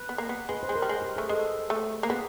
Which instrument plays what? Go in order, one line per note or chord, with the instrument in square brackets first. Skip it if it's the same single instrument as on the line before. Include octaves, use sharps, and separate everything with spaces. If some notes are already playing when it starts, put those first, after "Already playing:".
Already playing: [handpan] B4
[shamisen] B3
A#3
B3
[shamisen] G#3 [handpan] B4
[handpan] C5
[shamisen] G#3
[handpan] A#4
[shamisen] G3
G#3
[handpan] G4
[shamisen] A3 [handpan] G#4
[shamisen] G#3 [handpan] A4
[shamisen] A3
A#3
[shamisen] B3 [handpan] G#4